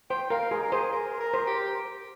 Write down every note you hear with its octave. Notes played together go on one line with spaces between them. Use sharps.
C5 G5
A#4 F5
G#4 A#4
A#4
G#4 C5
A#4
A#4
C5
G4